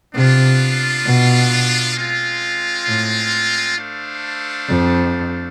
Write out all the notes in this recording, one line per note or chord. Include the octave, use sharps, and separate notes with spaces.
C3 B3 D4 F4
B2
G#3 C4 F4
A2
A3 D4 A4 C5 F5
F2